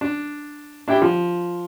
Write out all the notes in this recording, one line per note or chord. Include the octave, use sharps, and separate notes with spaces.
D4
D4 E4 G4 G5
F3